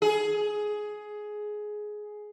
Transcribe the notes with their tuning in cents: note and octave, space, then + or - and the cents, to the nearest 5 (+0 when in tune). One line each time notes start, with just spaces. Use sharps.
G#4 +15